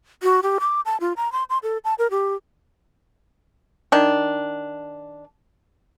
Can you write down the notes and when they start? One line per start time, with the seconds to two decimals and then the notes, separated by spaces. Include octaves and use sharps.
0.23 F#4
0.43 G4
0.60 D6
0.85 A5
1.00 F4
1.17 A#5
1.32 C6
1.50 C6
1.63 A4
1.84 A5
1.98 A#4
2.11 G4
3.92 D#3 D4